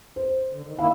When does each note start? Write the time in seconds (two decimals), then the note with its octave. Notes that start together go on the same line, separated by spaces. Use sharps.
0.16 C5
0.53 D3
0.67 D#3
0.79 D#3 A#3 E4 F5